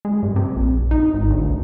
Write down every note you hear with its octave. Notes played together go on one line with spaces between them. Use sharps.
G#3
G2
C3
A#1
D#4
G#1
D2
C#2